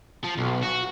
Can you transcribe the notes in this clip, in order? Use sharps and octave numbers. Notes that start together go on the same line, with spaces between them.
F3
B1
F#4